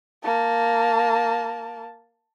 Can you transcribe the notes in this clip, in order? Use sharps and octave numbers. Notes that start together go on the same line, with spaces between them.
A#3 A5